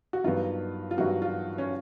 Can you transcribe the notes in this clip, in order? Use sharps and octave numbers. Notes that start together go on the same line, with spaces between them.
F#4
G2 D#3 F#3 B3 F4
F4
G2 D#3 F#3 B3 F#4
F4
C#4